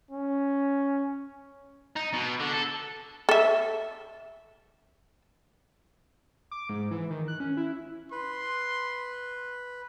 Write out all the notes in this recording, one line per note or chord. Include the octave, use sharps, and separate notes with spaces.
C#4
D#4
B2
D3
A4
A4 E5
D6
G#2
E3
D#3
F#6
C#4
E4
B4 C6